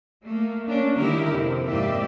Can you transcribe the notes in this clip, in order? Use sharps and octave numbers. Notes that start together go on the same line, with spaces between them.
A3 A#3
A#3 C#4 D4
D3 D#3 G#3 E4 G4 A#4
F2 C3
G#2 A#3 G4 D5 E5